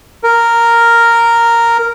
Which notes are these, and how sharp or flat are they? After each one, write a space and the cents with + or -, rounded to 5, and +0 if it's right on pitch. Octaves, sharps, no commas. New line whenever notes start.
A#4 -5